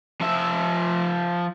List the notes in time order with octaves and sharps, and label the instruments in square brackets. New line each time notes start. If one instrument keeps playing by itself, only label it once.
[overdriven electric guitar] F3 E5